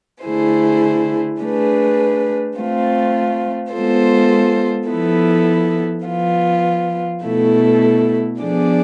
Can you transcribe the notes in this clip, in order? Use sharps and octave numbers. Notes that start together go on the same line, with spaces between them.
D3 A3 E4 G#4 C5
A3 D4 G#4 B4
A3 C4 F4
G#3 B3 F4 A4 C5
F3 B3 E4 A4
F3 B3 F4
B2 A3 E4 A4
F3 B3 D4 G#4 D5